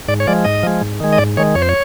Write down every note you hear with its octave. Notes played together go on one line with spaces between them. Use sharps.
G#2 D5
C#5
F3 G#3 D5
G#2 D#5
F3 G#3
G#2
D#3 G#3
D#5
G#2 D5
D#3 G#3 C#5
F2 C#5
C5
C#5